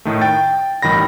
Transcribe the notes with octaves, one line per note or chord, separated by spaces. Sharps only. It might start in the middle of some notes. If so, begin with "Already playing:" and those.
A2 D#3 A3
G5 A6
A1 D#3 G3 B5 A#6